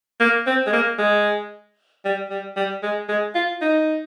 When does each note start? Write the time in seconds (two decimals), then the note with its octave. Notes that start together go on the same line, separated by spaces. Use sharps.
0.20 A#3
0.47 C4
0.66 G#3
0.73 A#3
0.99 G#3
2.05 G3
2.30 G3
2.57 G3
2.83 G#3
3.09 G#3
3.35 F4
3.61 D#4